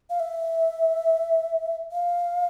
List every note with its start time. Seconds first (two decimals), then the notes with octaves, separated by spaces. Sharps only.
0.10 F5
0.20 E5
1.92 F5